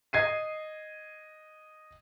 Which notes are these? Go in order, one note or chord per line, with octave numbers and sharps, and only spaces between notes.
D#5 G#6 C7 D#7